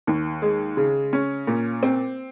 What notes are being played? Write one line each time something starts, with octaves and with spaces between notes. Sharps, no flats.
D#2
G#3
C#3
C#4
A#2
C4